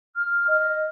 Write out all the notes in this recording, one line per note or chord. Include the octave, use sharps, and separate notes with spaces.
F6
D#5